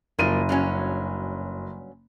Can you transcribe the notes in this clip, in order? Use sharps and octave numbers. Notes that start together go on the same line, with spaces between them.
F#1 F3 A#3 D#7
G2 F#3 C#4